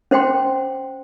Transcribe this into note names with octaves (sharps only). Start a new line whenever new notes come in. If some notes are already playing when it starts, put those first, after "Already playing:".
C#4 C5 F#5 G5 C6